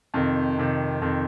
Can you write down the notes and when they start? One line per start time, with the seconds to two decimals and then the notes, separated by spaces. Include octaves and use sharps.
0.14 F2 C3 D#3
0.58 F2 C3 D#3
1.02 F2 C3 D#3